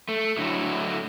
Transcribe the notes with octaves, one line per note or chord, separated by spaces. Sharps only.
A3
A2 D3 F#3 A3 E4